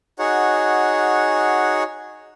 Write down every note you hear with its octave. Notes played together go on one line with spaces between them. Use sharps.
D#4 F#4 G#4 C#5 F#5